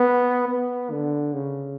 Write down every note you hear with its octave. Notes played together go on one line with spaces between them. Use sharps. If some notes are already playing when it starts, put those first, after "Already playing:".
Already playing: B3
B3
D3
C#3